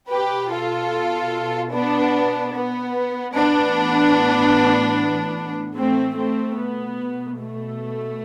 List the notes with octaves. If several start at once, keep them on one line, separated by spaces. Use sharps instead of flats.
B2 G4 B4
F4 A4
B3 D4
B3
A2 E3 B3 D4
A3 C4
A3 C4
B2 B3
A3